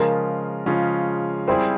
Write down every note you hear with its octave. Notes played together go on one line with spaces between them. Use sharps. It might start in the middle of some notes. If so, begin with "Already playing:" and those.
Already playing: C#3 F3 G#3 C#4 F4 A#4
C#3 F3 G#3 C#4 F4
G3 C4 E4 G#4 C5